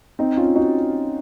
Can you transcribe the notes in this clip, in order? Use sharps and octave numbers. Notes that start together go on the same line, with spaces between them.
C4 D#4
C#4 F4
D#4 F#4